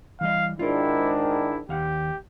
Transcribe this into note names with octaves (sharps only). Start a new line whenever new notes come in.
E3 G3 D#5 F5
G#2 D#3 D4 E4 F4 A#4
E4
D#2 G4 F5 F#5